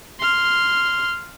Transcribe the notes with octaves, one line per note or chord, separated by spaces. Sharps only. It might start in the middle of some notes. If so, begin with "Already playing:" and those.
C6 F6